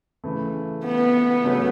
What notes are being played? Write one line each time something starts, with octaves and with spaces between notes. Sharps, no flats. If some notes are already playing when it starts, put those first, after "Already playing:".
C#3 E3 A3
B3
C#3 F#3 A3 C#4